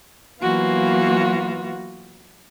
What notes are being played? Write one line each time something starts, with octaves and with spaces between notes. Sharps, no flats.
E3 F#3 A#3 B3 F4 F#4